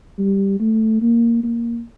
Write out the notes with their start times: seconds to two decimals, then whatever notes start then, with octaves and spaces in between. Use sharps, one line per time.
0.18 G3
0.60 A3
1.02 A#3
1.44 A#3